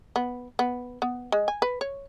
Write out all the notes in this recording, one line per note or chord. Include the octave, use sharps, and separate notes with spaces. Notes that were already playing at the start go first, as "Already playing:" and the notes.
B3
B3
B3
G#3
G#5
B4
C#5